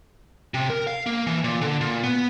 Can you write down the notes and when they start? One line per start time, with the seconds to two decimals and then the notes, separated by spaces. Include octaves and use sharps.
0.54 C3
0.70 A#4
0.87 F5
1.06 A#3
1.27 E3
1.44 A#2
1.61 D3
1.81 A#2
2.04 B3